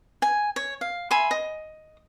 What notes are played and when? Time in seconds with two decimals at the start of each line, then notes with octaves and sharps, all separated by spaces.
0.22 G#5
0.56 C#5
0.81 F5
1.11 E5 G#5 B5 C6
1.31 D#5